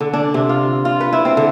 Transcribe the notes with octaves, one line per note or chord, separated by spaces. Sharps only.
D3
D4
C3
F4
F4
B4
E4
C4
D3